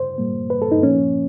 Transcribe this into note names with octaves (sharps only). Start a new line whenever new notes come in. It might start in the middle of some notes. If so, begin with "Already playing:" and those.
Already playing: C5
A#2 G3 A#3
B4
A4
D#4
A#2 F3 A#3 C#4